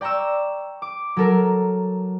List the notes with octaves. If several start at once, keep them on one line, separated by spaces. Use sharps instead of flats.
D5 G5 A#5 C#6 E6
D6
F#3 A4 A#4